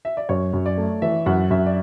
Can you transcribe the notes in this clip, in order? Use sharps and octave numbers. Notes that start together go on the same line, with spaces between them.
E5
D5
F#2 C#5
F#2
D5
A3
E3 E5
F#2 F#5
F#2 E5
D5